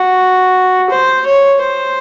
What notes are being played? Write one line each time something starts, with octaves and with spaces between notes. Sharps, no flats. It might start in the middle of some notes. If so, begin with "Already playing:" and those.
Already playing: F#4
C5
C#5
C5